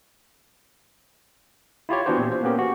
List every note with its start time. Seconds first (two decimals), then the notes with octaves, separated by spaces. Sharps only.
1.89 E4 F4 G4 C#5
2.06 E3 B3 D4 F#4 G4 C5
2.18 A#2 C4
2.32 C5
2.43 A#3 B3 C#4 G4 A#4
2.58 F#4